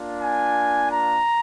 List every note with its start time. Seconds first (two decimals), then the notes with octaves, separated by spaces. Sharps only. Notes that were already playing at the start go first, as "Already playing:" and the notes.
Already playing: A#3 D4 F4
0.21 G#5
0.91 A#5